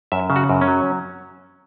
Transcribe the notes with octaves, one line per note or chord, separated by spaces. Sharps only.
F#2 E5
C#3
F#4
F#2
C#4
F#3